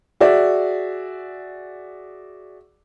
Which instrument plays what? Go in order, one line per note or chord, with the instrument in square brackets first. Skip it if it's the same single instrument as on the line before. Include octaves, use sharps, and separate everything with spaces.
[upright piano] F#4 G#4 D5 E5